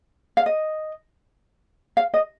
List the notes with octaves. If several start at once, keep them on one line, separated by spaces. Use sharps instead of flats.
F5
D#5
F5
D#5